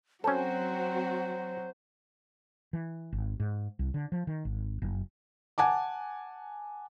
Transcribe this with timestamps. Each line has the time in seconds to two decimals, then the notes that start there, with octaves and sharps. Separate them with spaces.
0.24 F#3 C4 C#4 F#4 A4 C5
2.73 E3
3.12 G#1
3.40 G#2
3.79 C2
3.94 D3
4.12 F3
4.27 D#3
4.45 G#1
4.82 F#1
5.58 F#5 G#5 A5 D6